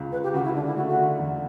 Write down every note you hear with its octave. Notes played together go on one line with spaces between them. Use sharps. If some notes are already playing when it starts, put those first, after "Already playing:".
Already playing: C#2 C#3
C#2 B4
G4
C#3 F#4
E4
D3 D4
E4
A3 F#4
F#4
D3
E2